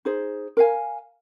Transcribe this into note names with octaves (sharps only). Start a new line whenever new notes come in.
D#4 G#4 C5
A#4 F5 G#5